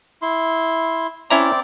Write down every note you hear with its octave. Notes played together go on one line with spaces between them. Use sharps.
E4 C6
C4 C#4 E4 D5 A#5